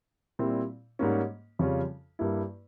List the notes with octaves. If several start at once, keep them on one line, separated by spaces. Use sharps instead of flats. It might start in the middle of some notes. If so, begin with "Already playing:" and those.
A#2 G3 C4 E4
G#2 G3 A#3 C#4
F2 C#3 G3 C#4 F4
G2 G3 A#3 E4